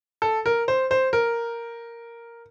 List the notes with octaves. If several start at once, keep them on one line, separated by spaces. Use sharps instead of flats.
A4
A#4
C5
C5
A#4